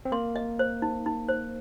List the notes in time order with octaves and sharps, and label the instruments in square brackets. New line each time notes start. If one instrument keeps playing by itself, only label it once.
[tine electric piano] C4
[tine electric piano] A#3 [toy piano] C6
[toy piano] D#5
C5
D#4
D#4
C5